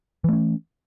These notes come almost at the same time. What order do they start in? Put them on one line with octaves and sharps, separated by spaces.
E3 A3 C#4